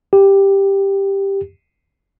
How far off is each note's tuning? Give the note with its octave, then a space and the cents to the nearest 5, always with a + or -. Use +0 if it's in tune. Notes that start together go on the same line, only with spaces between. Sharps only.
G4 +5